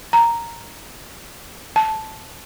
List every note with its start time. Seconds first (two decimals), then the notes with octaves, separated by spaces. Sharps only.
0.13 A#5
1.76 A5